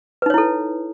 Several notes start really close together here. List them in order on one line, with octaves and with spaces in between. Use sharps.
B4 D#4 C#5 E4 A4